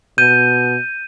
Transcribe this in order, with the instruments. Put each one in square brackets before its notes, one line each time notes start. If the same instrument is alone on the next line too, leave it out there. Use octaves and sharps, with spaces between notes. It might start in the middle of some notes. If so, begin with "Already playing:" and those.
[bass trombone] B2 [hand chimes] G6 [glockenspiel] D#7